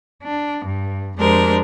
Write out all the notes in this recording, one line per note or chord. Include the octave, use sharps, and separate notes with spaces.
D4
G2
F2 G#3 D4 G4 A#4 C5